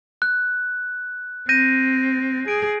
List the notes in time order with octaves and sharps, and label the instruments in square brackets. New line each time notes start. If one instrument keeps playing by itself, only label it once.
[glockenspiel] F#6
[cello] C4 [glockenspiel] G6 A#6 D#7
[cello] G#4 [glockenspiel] D7